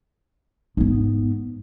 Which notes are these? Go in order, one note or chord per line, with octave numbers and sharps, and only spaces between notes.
G#2 B3